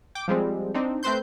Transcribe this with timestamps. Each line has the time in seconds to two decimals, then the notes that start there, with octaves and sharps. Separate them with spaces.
0.15 G5 D6
0.28 F3 G3 G#3 C4
0.74 C4 D4 D#4
1.03 A3 C4 B4 C5 C6 G6